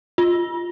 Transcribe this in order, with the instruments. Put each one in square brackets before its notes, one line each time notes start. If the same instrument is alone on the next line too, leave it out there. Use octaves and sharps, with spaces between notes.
[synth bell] F4